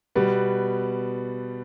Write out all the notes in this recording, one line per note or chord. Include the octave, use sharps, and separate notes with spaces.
B2 G3 B3